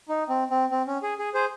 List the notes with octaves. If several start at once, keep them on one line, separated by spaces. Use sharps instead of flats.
D#4
C4
C4
C4
C#4
G#4
G#4
G#4 C5